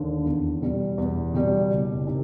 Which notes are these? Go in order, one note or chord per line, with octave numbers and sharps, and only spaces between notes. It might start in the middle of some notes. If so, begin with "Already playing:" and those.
Already playing: D#2 D3
E2
B2 G3
E2
B2 G3
F#1
C3 D#3